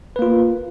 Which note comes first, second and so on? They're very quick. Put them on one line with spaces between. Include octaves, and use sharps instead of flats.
B4 A#3 F4